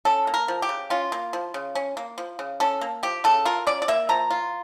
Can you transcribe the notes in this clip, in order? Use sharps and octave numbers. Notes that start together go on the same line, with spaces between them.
C#4 A4
A#3
A#4
F3
G4
C#3
C#4 F4
A#3
F3
C#3
C#4
A#3
F3
C#3
C#4 A4
A#3
F3 G4
C#3 A4
F4 A#4
C#4 D5
D5
A#3 E5
F3 A#5
F4